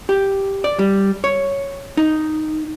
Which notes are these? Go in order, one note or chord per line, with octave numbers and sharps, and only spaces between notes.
G4
D5
G3
C#5
D#4